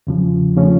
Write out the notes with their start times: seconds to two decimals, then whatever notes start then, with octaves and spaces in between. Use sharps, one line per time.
0.07 E2 C#3 F3
0.57 C#3 F3 A3 C#4